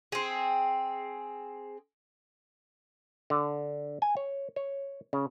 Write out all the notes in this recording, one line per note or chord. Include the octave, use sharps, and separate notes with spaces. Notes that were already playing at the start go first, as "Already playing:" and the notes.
C4 G#4
D3
G#5
C#5
C#5
C#3